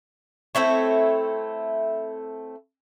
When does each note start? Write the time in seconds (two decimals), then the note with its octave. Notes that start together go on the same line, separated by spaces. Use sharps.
0.55 A3 C4 E4 C#5